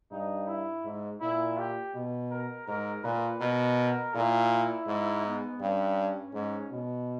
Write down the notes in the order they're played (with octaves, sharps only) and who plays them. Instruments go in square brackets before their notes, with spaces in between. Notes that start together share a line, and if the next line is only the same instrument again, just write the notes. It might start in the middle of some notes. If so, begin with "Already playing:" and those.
[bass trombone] G2 [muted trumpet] D#4
[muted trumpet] E4
[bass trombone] G#2
[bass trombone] A#2 [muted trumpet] E4
[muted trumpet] G4
[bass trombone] B2
[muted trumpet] A#4
[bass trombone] G#2 [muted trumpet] A#4
[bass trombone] A#2 [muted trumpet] B4
[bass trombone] B2 [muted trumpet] A#4
[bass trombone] A#2 [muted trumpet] E4
[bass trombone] G#2
[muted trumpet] B3
[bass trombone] G2 [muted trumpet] C#4
[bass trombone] G#2 [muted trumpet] C#4
[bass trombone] B2